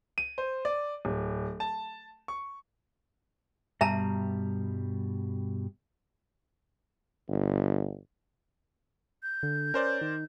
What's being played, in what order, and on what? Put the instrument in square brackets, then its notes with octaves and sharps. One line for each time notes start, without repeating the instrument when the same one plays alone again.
[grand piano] D#7
C5
D5
D1
A5
C#6
[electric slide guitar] G2 B2 G3 [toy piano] E5 A5 A#5
[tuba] G1
[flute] G6
[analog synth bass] D3
[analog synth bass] C#4 [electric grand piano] A#4 C5 D5
[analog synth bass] D#3